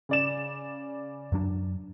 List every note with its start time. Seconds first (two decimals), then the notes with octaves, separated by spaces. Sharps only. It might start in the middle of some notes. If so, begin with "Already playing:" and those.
0.09 C#3 D5 E7
1.32 F#2 F#3 D4